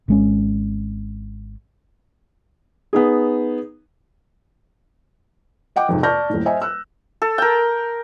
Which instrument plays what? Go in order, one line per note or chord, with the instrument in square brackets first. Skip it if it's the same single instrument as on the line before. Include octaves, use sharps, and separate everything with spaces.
[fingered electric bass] G#1 G#3 C#4
[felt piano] B3 D#4 G#4
D#5 F#5 G5 D6
F2 G#2 C3
D5 A5 C#6 F6 G6 A#6
D#1 A2
C5 D#5 E5 G#5
E6 F#6
[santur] A4
A#4 G5